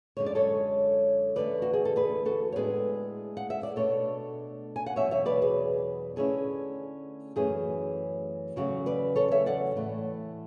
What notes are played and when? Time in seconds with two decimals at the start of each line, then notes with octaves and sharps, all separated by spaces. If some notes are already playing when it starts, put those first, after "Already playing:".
0.17 F#2 D3 G#3 C#5
0.26 D5
0.35 A4 C#5
1.36 E2 D3 A3 B4 D5
1.62 F#4
1.73 G#4
1.85 A4
1.96 G#4 B4
2.26 F#4 A4
2.52 C#5
2.56 A2 G#3 B3 D4 G#4 B4
3.37 F#5
3.50 E5
3.63 D5
3.76 B2 A3 D4 A4 C#5
4.76 G#5
4.86 F#5
4.96 E2 B2 F#3 C#5 E5
5.11 C#5 E5
5.26 B4 D5
5.42 G#4 B4
6.16 D3 A3 C#4 E4 G#4
7.36 F#2 E3 A3 C#4 E4 G#4
8.56 E2 C#3 F#3 A3 F#4
8.86 B4 D5
9.16 A4 C#5
9.31 C#5 E5
9.46 D5 F#5
9.76 A2 E3 A3